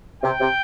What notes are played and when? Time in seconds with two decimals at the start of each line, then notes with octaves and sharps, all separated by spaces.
0.23 C3 G5
0.40 C3